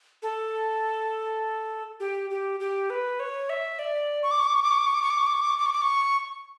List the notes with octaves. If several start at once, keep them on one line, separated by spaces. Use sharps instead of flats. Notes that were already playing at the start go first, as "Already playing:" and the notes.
A4
G4
G4
G4
B4
C#5
E5
D5
C#6
D6
C#6
D6
C#6
D6
C#6
D6
C#6
D6
C#6
D6
C#6
D6
C#6
D6
C#6
D6
C#6
D6
C#6